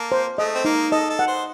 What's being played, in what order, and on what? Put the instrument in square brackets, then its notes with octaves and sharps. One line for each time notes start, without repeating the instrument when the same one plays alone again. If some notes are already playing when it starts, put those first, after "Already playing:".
Already playing: [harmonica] A#3 [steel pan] A5
[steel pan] C5
[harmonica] A3 [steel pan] D#5
[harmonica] C4
[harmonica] A#3 [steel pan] D#4
[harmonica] A4 [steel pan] D#5
[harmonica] A4
[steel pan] F#5
[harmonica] C5